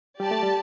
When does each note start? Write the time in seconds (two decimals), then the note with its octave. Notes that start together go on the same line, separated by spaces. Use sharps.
0.19 G3 G4 D5 A5
0.31 A3
0.43 G3